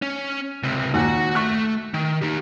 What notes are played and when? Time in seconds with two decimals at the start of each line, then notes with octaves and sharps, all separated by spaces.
0.02 C#4
0.63 C#2 C3
0.94 D#2 A#2 F#4 F#5
1.35 A3 C#6 F#6
1.94 D#3
2.22 D#4 G4